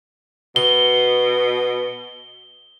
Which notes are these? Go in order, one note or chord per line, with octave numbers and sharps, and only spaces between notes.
B2 G7